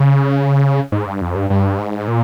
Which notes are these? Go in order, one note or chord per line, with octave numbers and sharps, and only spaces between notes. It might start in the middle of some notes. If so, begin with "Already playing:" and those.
Already playing: C#3
G#2
G2
F2
G2
G2
G#2
A#2